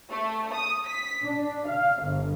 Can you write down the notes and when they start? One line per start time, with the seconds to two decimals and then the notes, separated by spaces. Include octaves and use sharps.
0.12 A3
0.53 D#6
0.87 B6
1.24 D4
1.67 F5
2.04 G1